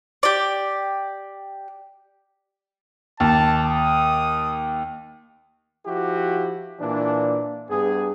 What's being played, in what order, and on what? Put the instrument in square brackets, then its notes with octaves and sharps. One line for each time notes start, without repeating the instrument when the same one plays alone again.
[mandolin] G4 D5
[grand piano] D#2 [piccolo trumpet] A5
[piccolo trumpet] D#6
[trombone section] F3 E4 F#4 G4
A#2 E3 D4
G2 B3 G#4